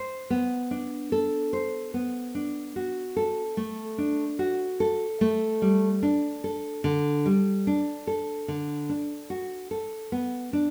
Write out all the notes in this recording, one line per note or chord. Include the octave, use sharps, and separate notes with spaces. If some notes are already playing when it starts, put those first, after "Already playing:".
Already playing: C5
B3
D4
A4
C5
B3
D4
F#4
A4
A3
D4
F#4
A4
A3
G3
D4
A4
D3
G3
D4
A4
D3
D4
F#4
A4
B3
D4